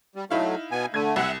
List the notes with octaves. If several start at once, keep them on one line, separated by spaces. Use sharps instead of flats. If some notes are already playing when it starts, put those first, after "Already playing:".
G3
F#3 A3 D#4 E4 F5
B2 B3 G#5
D3 A3 G#6 D#7
C2 E5 F#5